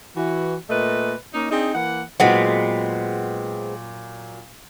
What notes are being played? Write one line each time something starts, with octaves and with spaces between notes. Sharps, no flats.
E3 F#4
A#2 A3 B4 D#5
A#3 C#4 D#4
C4 D4 D#4 G#4
E3 A#3 F#5
A#2 F#3 G#3 B3 C4 F#5